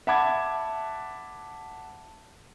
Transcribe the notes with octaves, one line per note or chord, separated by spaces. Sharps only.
E5 F#5 A5 B5 D6 G#6